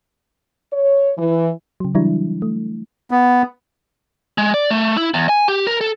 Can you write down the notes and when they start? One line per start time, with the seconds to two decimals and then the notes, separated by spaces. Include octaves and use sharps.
0.73 C#5
1.18 E3
1.80 C#3 F#3
1.95 E3 F#3 G3 D4 E4
2.42 A3
3.11 B3
4.38 G#3
4.54 D5
4.70 A3
4.97 E4
5.14 E2
5.29 G#5
5.48 G4
5.67 A#4
5.81 A4